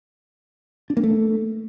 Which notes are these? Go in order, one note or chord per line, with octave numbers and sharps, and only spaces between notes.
D4
A#3
A3